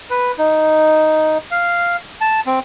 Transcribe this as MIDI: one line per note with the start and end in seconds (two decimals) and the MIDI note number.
0.10 0.32 71
0.38 1.38 63
1.51 1.96 77
2.21 2.40 81
2.46 2.60 60